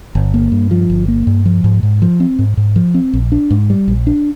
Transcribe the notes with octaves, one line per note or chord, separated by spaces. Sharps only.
G1
A#3
G2
F3
G1
A#3
G2
F3
G#2
G#2
F3
C4
G#2
G#2
F3
C4
A#1
D4
G#2
G3
A#1
D4